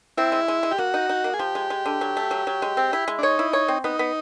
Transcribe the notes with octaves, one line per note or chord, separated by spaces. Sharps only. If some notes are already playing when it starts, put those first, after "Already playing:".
C4 E4
G#3
G#3
G#3
G4
A#3 F#4
D#4
D#4
A#3
G#4
F3 G4
G#3
G#3
D3
F#3
A3
F#3
F#3
G#3
C4
E4
G#3
D4
D#4 C#5
E4
C#5
C4
B3 D#4
B3